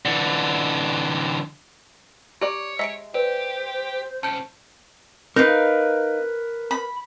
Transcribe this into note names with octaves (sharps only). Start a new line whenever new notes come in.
D3 E3
G4 C#5 D5 A#5
G#3 E5 A#5 B6 C#7 D7
G4 B4 C5 D5
D#2 C#4 A5 G6 D7
D#4 A#4 B4 F5
B5